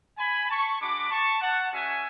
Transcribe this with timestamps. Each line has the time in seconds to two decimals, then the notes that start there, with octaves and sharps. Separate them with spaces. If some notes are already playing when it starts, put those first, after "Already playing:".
0.18 G#5 B5
0.49 A5 C#6
0.80 G#3 D4 F#4 B5 D6
1.11 A5 C#6
1.42 F#5 A5
1.72 G#3 C#4 F#4 E5 G#5